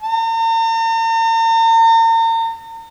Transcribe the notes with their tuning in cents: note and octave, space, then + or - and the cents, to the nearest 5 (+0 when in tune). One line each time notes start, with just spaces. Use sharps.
A#5 -45